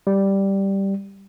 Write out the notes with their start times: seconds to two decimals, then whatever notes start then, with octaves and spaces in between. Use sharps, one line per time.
0.07 G3